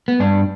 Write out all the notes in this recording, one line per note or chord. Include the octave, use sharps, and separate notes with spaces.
B3
G2 D4